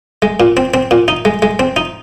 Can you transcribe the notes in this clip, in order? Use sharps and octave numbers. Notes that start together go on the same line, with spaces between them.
G#3
A#2
C4
C4
A#2
D#4
G#3
G#3
C4
D#4